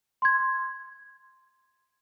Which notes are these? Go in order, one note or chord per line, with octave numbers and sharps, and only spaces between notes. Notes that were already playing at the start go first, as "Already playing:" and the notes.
C6 G#6